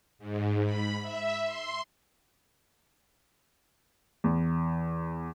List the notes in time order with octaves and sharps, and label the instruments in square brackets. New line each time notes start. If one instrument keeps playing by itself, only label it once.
[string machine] G#2
B5
E5
C6
[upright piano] E2